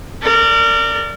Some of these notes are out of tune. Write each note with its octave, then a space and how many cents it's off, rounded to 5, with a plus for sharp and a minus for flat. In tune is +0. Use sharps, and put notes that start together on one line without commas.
A#4 -30 D5 +0